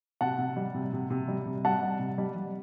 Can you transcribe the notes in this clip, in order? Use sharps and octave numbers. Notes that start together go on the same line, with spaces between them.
C3 F#5 A5
C3
G3
C3
C3
C3
G3
C3
G3 F#5 A5
G3
C3
G3
G3